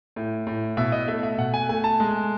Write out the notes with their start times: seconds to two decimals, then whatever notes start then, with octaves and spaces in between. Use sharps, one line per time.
0.16 A2
0.47 A2
0.77 B2 E5
0.92 D#5
1.08 A3 E5
1.23 E5
1.38 B2 F#5
1.54 G#5
1.69 A3 G#5
1.84 A5
2.00 G#3